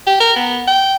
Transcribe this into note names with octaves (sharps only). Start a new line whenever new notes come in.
G4
A#4
B3
G5